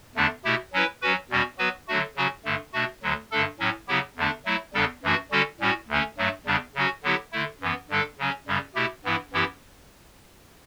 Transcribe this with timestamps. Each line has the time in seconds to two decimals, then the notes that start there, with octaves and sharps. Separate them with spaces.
0.16 E2 D3 A3 D4
0.45 B2 A3 E4 G4
0.73 F#3 C#4 E4 B4
1.02 F#3 C#4 F#4 B4
1.30 E2 B2 G3 C#4 F#4
1.58 F#3 B3 F#4 B4
1.88 D3 F#3 A3 D4 F#4
2.16 C#3 F#3 C#4 F#4
2.45 G2 D3 A3
2.73 B2 A3 D4 F#4
3.02 D2 D3 F#3
3.31 G2 D3 A3 D4 A4
3.59 A2 F#3 C#4
3.88 C#3 F#3 B3 E4 G4
4.17 E2 D3 A3 D4
4.45 F#3 A3 E4
4.74 E2 C#3 G3 D4 A4
5.03 F#2 E3 A3 D4 F#4
5.31 D3 G3 C#4 F#4 A4
5.60 A2 G3 C#4 F#4
5.89 D2 D3 A3 C#4
6.18 G2 F#3 A3
6.46 E2 C#3 G3 D4
6.75 C#3 F#3 C#4 F#4
7.03 D3 F#3 B3 E4 G4
7.32 D3 A3 E4
7.61 F#2 E3 B3
7.89 G2 D3 G3 D4 A4
8.18 C#3 F#3 C#4
8.47 F#2 C#3 G3
8.75 B2 A3 E4 G4
9.04 G2 E3 B3 E4
9.32 F#2 E3 B3 E4 G4